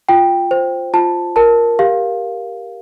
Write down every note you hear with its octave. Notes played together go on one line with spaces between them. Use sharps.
F4 G5
C5
F4 A5
A#4 A5
G4 F5